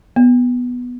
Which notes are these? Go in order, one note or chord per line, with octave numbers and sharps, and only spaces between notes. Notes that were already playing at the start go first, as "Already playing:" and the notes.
B3